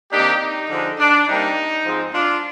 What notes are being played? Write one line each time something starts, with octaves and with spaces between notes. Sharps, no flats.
C3 D#3 A#3 D4 D#4 G4
D#4
D3 F3 G#3 D4
D4
C3 G3 A#3 D#4
G#2 F3 G#3 C4
D4 F4